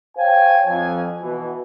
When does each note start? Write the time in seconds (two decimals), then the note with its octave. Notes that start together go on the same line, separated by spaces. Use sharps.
0.17 C5 C#5 F5 G5 G#5
0.66 F2 F3 G#5
1.21 B2 E3